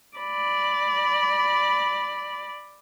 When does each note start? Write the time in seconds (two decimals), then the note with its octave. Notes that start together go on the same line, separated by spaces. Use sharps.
0.18 D5 B5